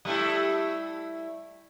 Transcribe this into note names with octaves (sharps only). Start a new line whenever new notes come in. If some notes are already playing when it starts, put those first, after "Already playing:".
G3 A3 E4